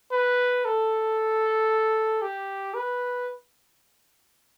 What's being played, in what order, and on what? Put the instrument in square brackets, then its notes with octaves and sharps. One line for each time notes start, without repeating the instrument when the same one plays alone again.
[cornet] B4
A4
G4
B4